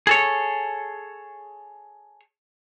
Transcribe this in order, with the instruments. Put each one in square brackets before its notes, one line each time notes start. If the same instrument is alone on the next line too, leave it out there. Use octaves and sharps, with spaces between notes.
[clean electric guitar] G#4 A4 C#5